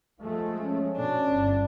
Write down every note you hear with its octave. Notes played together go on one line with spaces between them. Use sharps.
F3 G#3 A3
C#4
B2 D4
G1